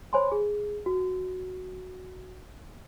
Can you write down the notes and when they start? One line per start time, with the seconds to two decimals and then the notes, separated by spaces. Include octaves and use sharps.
0.13 C5 C#5 G#5 B5 C6
0.32 G#4
0.86 F#4